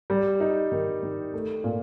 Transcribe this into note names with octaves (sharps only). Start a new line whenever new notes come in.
G3
D#4
D#3
D#3
A3
A#2